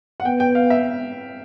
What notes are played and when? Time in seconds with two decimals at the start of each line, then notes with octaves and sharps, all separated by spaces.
0.20 F#5
0.25 B3 G5
0.40 G5
0.55 F5
0.70 E5